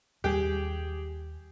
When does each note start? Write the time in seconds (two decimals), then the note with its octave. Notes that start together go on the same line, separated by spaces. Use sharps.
0.24 D#2 G3 G4 G#4